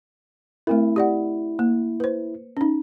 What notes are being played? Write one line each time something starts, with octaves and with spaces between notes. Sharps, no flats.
A3 C4 E4 A#4
G4 D5 F#5
A#3
B4 C5
C#4 D#4